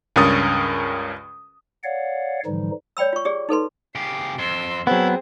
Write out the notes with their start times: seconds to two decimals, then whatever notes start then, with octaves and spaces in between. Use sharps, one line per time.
0.16 C#2 G2 C#4 A#4 D#6 A6
1.84 C#5 D5 F5 F#5
2.46 G#2 D3 E3 F3 G3 D#4
2.97 C#5 D5 G5 B5 E6
3.13 F4 C#6
3.25 G4 G#4 D5
3.49 D#4 A4 B4 C6
3.95 C#3 G4 C7
4.39 F2 C6 E6
4.87 F#3 B3 C4 E4 G#4